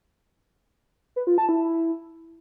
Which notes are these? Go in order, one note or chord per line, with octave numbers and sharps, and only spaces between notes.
B4
F4
A5
E4